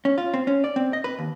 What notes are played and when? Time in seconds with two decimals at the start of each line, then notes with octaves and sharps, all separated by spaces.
0.05 C#4
0.18 F4
0.34 C4
0.47 C#4
0.64 D5
0.76 C4
0.93 D#5
1.04 B4
1.19 D#2